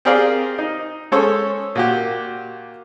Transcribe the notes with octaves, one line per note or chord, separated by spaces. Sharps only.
C4 G4 G#4 A#4 D5 F5
D#4
G#3 C#4 A4 C5 C#5
A#2 F#4 G4